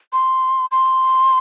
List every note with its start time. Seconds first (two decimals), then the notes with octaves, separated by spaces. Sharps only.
0.13 C6
0.72 C6